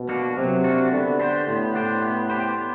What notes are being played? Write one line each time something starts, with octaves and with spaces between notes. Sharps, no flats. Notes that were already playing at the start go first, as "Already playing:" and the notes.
Already playing: B2
A#3 D4 F#4
C3 F#3
A#3 D4 F#4
D3 B3
D4 G4 C5
A2 B3
D4 G4 C5
B3
D4 G4 C5
B3